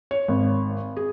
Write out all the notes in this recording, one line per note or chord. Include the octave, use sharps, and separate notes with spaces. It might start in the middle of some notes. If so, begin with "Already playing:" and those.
C#5
G#1
G#4